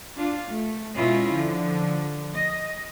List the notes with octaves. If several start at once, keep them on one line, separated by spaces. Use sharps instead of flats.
D4 F4
A3
B2 G#3 C#4 E4 F4
D3 F3
D#5